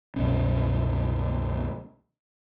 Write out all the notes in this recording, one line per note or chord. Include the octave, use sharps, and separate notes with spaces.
C2 F#2 B2 C#4